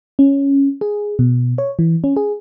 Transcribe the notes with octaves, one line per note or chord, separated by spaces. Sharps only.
C#4
G#4
B2
C#5
E3
C#4
G#4